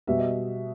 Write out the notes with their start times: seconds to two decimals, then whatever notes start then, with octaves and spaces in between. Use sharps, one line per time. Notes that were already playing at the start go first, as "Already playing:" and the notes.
0.07 B2 G3 B3 E5
0.18 D#5